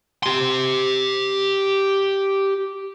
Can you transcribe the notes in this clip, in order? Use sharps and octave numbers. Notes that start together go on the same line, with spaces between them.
G4 C6